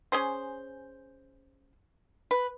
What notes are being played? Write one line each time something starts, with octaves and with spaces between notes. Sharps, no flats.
C#4 G#4 C5
B4